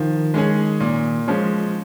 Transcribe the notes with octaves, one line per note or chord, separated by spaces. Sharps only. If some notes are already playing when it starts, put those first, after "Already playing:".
Already playing: D#3 F3
G#3 C#4 G#4
A#2
F3 G#3 C#4